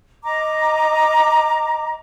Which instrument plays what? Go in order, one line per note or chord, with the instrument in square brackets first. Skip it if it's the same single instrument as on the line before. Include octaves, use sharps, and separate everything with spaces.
[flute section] D#5 A#5 D6